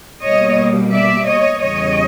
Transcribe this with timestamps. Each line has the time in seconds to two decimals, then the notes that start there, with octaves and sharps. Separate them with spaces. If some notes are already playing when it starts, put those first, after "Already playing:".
0.23 B2 G3 A#3 C#5 D#5
0.92 D5 E5
1.26 C#5 D#5
1.59 E2 C#3 E3 G3 C#5 D#5